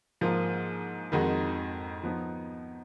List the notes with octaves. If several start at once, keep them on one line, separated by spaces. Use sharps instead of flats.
G#2 F3 A#3 F4
F2 D#3 G#3 D#4 F#4
F3 B3 D#4